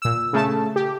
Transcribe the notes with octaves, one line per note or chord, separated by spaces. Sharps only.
A#2 E6
C#3 A3 A5
G4